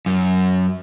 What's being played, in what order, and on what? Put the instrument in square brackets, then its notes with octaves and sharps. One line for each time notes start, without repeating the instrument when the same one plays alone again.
[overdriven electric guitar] F#2